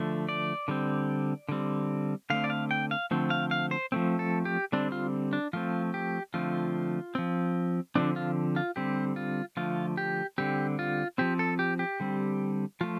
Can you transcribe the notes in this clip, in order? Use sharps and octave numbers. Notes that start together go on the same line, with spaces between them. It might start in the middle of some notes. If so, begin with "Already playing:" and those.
Already playing: D3 F3 A3
D5
D3 G3 C4
D3 G3 C4
D3 A3 C4 F5
D5
F5
G5
F5
D3 F3 A3 C4
F5
F5
C5
F3 A3 C4
A4
G4
D3 G3 C4 D4
F4
D4
F3 A3 C4 F4
G4
D3 F3 A3 C4 F4
F3 C4
D3 F3 A3 C4 D4
F4
F4
D3 G3 C4 G4
F4
D3 F3 A3 F4
G4
D3 G3 C4 G4
F4
F3 C4 G4
A4
G4
G4
D3 G3 C4
F3 A3 F4